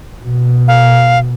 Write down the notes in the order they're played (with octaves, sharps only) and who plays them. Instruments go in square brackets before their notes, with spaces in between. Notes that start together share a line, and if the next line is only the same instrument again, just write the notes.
[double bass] B2
[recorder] F5